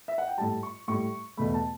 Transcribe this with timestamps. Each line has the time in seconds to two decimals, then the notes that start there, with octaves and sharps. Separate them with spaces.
0.08 E5
0.18 F#5
0.28 G5
0.38 A2 G3 A5
0.63 C#6
0.88 A2 G3 C#6
1.37 E2 B2 A3 B5
1.54 A5